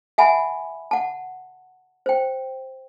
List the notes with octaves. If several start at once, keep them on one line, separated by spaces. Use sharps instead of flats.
E5 F#5 G#5 A5 B5
F#5 A5
C5 G5